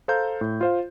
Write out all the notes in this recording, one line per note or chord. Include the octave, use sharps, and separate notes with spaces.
A4 C5 F5 A#5 G6
A2
F4 C5 F5